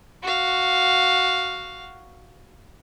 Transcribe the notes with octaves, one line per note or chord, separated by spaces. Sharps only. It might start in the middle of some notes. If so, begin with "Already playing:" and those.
F#4 F5